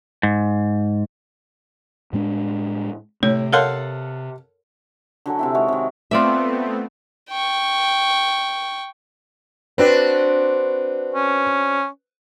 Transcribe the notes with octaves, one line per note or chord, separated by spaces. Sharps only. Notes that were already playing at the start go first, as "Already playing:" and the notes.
G#2
A2 G#3 D4
A2 C3 C#5
A4 A#4 C#5 F5 F#5 C6
D3 F#3 A4 G#5
C3 C4 E4
D#3 G#3 F#4 C#5
C3 D#3
A3 B3 C4 F4 D5 E5
G5 C#6
C4 D4 F#4 B4
C#4